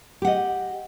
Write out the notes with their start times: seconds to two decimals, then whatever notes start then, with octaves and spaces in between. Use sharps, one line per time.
0.22 G4
0.25 F#5
0.27 D#5